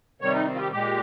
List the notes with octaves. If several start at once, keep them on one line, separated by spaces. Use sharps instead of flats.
C3 D#3 G3 C#5
D#4
C4
F4
G4
A#2 G#3 G4